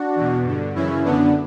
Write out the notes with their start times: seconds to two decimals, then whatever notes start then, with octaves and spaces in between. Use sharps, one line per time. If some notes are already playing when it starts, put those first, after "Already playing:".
Already playing: D4 F#4
0.15 E2 B2
0.45 G2 D3
0.75 F#2 C#3 E3 C#4 E4
1.04 F#2 D3 B3 D4